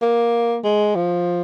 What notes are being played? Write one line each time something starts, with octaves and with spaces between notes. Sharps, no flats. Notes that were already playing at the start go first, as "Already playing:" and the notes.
A#3
G#3
F3